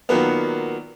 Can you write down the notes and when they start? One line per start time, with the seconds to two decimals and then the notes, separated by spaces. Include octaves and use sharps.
0.09 A#2 D#3 F#3 A#3 B3